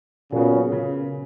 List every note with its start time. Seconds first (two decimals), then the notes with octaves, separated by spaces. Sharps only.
0.32 A#2 C#3 F#3 B3
0.72 C#3